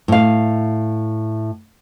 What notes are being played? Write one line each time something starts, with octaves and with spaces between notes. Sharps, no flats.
A2 F5